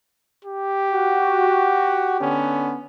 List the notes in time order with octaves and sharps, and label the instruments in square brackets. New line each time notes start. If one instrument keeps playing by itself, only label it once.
[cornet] G4
[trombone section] F#4
D3 B3 C#4